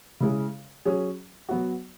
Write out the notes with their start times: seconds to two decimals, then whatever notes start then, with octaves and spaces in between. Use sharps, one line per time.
0.20 C#3 G#3 E4 G#4
0.85 F#3 C#4 G#4
1.49 F#3 B3 F#4